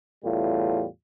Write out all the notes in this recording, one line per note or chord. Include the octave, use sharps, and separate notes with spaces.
E2 A2 G3 F4